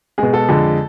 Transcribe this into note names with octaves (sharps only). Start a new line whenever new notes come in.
B2 G#3 G#4
A4
F2 D3 G#3